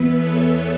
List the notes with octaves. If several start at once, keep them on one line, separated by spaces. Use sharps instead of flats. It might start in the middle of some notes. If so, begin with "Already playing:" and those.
Already playing: E2 E3 B3 B4 E5
A4 C#5